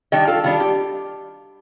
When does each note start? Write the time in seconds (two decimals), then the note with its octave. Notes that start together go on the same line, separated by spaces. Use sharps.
0.12 D#3 G3 D4 D#5 G5
0.28 F4 A4
0.44 D#3 G3 D4 F4
0.60 G4